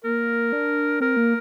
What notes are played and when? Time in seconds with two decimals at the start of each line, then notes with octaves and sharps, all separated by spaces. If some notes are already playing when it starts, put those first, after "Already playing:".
0.03 A#3 A#4
0.53 D4
1.00 C4 A#4
1.17 A#3